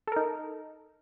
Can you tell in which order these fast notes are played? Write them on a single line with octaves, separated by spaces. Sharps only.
A4 A#4 D#4